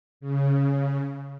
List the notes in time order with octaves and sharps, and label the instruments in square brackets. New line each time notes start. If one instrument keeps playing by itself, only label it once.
[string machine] C#3